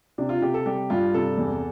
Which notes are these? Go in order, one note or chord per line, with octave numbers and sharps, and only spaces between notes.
C3 D4
F4
C3 G4
A4
G3 G4
G2 F4
C3 A4
E2